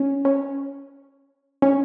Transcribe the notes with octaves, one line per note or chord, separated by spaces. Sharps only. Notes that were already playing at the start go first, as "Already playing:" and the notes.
Already playing: C#4
C#4
C#4